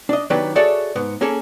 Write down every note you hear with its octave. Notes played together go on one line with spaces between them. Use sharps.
D4 D#5
D#3 F#3 B3 D4 G4
F#4 G#4 A4 C#5 D5 E5
G#2 B3
A#3 C#4 G#4 A4